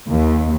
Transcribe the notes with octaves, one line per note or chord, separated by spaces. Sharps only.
D#2